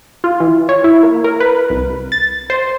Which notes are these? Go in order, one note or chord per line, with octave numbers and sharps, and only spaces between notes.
F4
E3
C#5
E4
A#3
A#4
B4
C2
A6
C5